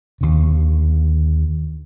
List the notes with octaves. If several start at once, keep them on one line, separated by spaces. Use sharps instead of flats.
D#2 D3